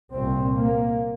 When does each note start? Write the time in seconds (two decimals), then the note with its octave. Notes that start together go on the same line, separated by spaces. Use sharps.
0.13 C2 A#2 C4
0.56 A#3